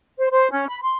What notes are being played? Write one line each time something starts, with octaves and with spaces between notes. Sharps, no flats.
C5
C5
C#4
B5
C6